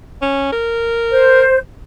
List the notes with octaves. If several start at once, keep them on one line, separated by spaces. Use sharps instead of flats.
C#4
A#4
C5